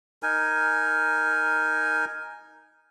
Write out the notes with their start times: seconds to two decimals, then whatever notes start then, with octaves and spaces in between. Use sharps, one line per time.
0.23 D#4 A#4 G#5